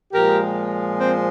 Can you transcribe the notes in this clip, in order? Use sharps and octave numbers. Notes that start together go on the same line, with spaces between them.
A#2 F3 G#3 G4 A#4
C4